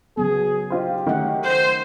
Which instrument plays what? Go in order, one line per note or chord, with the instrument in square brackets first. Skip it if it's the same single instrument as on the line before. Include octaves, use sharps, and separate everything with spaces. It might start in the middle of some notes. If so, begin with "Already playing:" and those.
[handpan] C#3 F#3 B3 [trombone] G#4
[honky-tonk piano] D#4 F4 C5 [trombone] G4
[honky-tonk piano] D#3 A3 [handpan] C#4 F#5
[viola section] C5